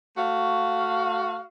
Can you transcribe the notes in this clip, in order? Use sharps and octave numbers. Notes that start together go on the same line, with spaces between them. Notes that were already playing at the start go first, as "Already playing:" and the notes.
A3 F#4 F5